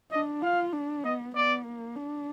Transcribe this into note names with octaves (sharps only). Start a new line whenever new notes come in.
D4 D#5
F4 F5
D4
B3 D#5
B3 D5
A#3
D4